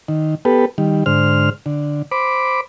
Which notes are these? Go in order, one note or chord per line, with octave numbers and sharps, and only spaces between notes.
D#3
B3 G4 A4 B4
D#3 G3
G#2 D3 C5 F6
D3
C5 B5 D6